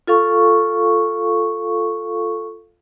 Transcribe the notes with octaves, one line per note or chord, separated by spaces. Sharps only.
F4 A4 F5 C#6